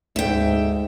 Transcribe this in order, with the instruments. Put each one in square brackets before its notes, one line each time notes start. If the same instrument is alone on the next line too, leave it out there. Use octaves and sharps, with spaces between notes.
[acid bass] D2 [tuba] G#2 [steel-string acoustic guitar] E5 G5